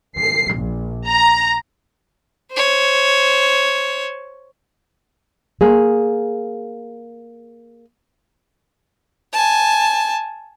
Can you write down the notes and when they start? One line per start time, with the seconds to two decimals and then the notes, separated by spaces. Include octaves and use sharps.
0.18 C7
0.56 A#1
1.06 A#5
2.52 C5 C#5
5.61 A#3 G#4
9.33 G#5 A5